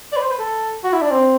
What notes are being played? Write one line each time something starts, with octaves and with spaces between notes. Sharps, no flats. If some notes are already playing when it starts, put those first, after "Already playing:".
D5
B4
C5
B4
A4
F#4
E4
D4
C4